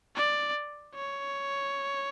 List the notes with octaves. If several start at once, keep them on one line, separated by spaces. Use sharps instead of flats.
D5
C#5